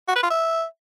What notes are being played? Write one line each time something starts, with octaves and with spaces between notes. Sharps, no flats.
F#4
B4
F4
E5